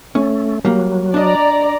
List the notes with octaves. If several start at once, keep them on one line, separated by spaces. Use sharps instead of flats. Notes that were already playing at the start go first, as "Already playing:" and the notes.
A3 C#4
F#3 G3 A#3
D4 D5 D#5 A#5